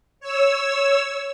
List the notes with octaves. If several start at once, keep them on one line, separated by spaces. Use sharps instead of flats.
C#5 E6